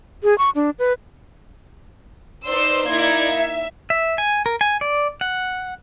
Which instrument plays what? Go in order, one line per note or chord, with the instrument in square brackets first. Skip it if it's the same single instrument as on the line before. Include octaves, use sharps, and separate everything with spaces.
[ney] G#4
C#6
D4
B4
[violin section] D#4 B4 C5 D5 C6 E6
A#3 D#4 E4 D5 G#6
E5
[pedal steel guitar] E5
G#5
A#4
G#5
D5
F#5